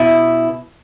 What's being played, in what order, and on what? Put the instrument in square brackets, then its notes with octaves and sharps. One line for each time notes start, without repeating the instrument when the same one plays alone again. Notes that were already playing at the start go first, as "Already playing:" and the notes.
Already playing: [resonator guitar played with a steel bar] B2 E4